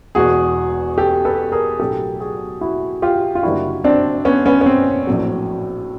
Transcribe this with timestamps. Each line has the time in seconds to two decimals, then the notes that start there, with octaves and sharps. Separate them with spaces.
0.15 E1 E2 B2 F#4 G#4
0.98 G4 A4
1.25 A4 B4
1.52 G#4 A#4
1.80 B1 A2 F#3 G4 A4
2.20 F#4 G#4
2.61 E4 F#4
3.02 F4 G4
3.35 F4
3.43 F#1 F#2 D3 G3 E4 F#4
3.84 C4 D4
4.25 B3 C#4
4.46 B3 C#4
4.61 C#4
4.66 C4
5.07 A#1 A2 F#3